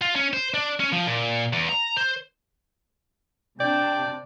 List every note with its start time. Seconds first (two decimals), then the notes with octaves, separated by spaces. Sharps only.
0.01 F4
0.16 C#4
0.33 C5
0.54 D4
0.80 C#4
0.93 F3
1.07 A#2
1.53 E2
1.69 A#5
1.97 C5
3.60 C3 D4 D5 G5